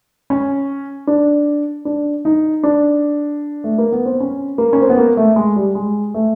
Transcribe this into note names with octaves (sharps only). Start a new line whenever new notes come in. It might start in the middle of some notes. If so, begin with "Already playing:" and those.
C#4
D4
D4
D#4
D4
A3
A#3
B3
C4
C#4
A#3
C#4
C4
B3
A#3
A3
G#3
G3
G#3
A3